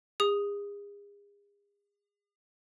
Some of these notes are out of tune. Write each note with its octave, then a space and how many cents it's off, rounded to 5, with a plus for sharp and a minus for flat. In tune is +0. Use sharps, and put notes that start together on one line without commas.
G#4 -40 D#6 +0